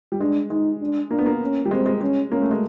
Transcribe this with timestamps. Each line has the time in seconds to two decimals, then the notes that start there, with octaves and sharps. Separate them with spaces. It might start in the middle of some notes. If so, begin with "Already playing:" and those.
0.12 G3
0.20 G#3 D4
0.50 G#3 D#4
0.80 D4
1.11 A#3 D4
1.19 B3
1.26 A#3
1.41 C#4
1.65 G3
1.71 G#3 C4
1.86 G#3
2.01 G#3 C#4
2.31 A#3 C#4
2.42 A3
2.51 G#3